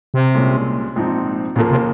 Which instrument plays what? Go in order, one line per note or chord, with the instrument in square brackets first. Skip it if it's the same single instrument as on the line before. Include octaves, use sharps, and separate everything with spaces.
[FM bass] C3
[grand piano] C2 A#2 G#3 C#4
A#1 G#2 F3 C4 D#4
[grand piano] D#2 C#3 F3 A#3 [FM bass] A#2
[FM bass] C3